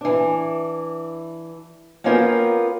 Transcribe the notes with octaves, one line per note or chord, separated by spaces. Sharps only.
E3 D4
A#3 B3 C#4 F4 A#4 G5